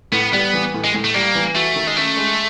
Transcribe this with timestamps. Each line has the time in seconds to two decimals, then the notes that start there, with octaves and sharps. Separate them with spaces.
0.12 A2 B3
0.33 G3 B3
0.53 E3
0.74 A2
0.84 G#3
0.94 A2
1.04 A3
1.14 G3 A#3
1.35 E3
1.55 A3 F#4
1.76 D#3
1.87 G#3
1.96 A3 C#4
2.17 G#3